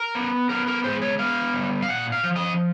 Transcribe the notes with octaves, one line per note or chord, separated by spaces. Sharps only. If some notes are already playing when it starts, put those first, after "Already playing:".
Already playing: A#4
B3
B3 A#4
A#4
G#3 C5
C#5
B3 F5
G3
F5
A#2 F#5
F5
F3
D#5